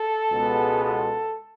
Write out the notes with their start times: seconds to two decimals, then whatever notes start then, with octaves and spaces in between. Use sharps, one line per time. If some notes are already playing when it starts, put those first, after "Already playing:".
Already playing: A4
0.32 C#2 B2 G#3 B3
0.82 A4